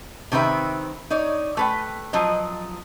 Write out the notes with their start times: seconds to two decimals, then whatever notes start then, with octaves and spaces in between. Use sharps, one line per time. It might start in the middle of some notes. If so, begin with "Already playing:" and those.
0.32 C3 D#3 C4 B4 E5
1.10 D#4 C#5 D5
1.57 A3 B4 G5
2.13 F3 F#3 D#5